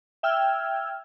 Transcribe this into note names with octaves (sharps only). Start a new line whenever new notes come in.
E5 G5 E6 F6 G#6